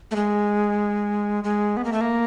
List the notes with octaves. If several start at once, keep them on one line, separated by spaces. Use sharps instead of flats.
A3
G#3
G#3
B3
A#3
A3
A#3